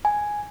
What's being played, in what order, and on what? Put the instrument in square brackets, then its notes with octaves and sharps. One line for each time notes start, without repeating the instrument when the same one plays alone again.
[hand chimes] G#5